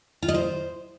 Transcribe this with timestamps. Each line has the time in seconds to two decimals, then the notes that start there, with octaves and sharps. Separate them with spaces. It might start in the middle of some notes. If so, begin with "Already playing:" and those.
0.22 F4
0.28 D#5
0.34 C5